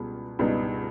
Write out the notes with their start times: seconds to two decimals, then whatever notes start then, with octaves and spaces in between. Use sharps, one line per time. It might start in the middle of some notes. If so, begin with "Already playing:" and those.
Already playing: C#2 B2 G3 B3
0.39 C#2 B2 G3 B3 D#4